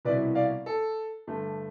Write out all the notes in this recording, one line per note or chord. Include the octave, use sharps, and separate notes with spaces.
C2 B2 B3 E4 B4 D5
D5 F5
A4
G2 D3 A3